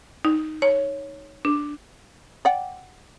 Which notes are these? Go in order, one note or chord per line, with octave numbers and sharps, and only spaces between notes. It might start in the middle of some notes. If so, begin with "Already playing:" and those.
D#4
C#5
D4
D5 F#5 G5